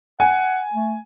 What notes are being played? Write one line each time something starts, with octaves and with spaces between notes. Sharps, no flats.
F#5 G#5
A3